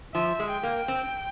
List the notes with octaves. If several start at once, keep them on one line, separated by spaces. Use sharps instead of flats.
F3 E5
G#3
G5
A#3
C4